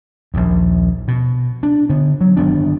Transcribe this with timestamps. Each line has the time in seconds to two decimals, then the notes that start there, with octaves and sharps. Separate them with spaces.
0.34 A#1 D#2
1.08 B2
1.63 D4
1.89 D3 B3
2.21 F#3
2.37 G1 D#3 B3 D4